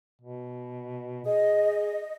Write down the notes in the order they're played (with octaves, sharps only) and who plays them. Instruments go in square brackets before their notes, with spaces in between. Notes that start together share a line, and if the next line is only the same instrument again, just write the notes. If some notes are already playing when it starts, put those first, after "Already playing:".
[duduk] B2
[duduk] G#4 [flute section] D#5